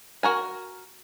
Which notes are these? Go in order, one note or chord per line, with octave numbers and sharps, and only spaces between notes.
F#4 A#4 G#5